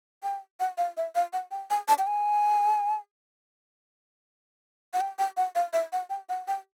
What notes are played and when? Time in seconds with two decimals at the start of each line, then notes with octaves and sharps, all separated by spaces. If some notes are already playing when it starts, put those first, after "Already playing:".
0.23 G5
0.60 F#5
0.78 F5
0.97 E5
1.15 F5
1.33 F#5
1.51 G5
1.70 G#5
1.88 A5
1.98 G5
2.07 G#5
4.93 F#5
5.01 G5
5.19 G5
5.37 F#5
5.55 F5
5.73 E5
5.93 F#5
6.10 G5
6.29 F#5
6.48 G5